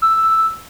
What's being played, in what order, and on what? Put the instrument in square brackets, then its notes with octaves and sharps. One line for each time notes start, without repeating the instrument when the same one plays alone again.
[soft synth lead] E6